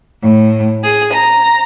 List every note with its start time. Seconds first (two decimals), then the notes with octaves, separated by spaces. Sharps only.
0.22 A2
0.83 G#4
1.12 A#5